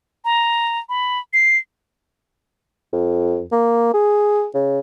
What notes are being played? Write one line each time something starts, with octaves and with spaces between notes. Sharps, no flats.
A#5
B5
C7
F2
A#3
G#4
C#3